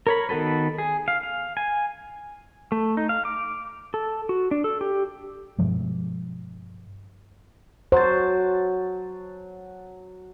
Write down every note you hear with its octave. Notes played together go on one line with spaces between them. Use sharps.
A#4 C#5 B5
D#3 B3 F#4 A4 B4
G#4
F5
F5
G#5
A3
D#4
F5
D6
A4
F#4
D4
A4
G4
G2 B2 F3 G#3
F#3 C5 A5